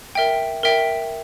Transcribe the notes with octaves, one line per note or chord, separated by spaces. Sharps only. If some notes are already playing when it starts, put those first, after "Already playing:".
A#4 E5 G5
A#4 E5 G5